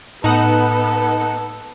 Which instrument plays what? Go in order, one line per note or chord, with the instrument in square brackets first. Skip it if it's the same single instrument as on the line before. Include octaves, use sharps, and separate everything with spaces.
[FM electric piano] A2 [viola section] B3 [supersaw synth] D#4 F#5 [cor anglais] A4